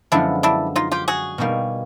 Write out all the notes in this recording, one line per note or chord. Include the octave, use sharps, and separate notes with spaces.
F#2 D3 F3 G#3 B3 D4 E4
D4 E4
D#4 F4
F4 G4
F#4 G#4
B2 G3 A#3 D#4